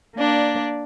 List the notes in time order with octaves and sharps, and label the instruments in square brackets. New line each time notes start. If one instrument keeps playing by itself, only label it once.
[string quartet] A#3 D4 D5